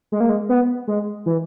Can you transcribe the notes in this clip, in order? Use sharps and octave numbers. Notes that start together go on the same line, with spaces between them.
G#3
A#3
G#3
B3
G#3
E3